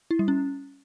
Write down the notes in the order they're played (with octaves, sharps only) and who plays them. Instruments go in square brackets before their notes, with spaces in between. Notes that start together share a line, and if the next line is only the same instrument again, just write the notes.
[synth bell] E4
G3
C#4